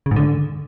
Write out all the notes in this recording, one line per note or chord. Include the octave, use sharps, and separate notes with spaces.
C#3
G#2
D3